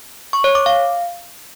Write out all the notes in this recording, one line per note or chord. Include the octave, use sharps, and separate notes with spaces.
C#6
C#5
D6
F5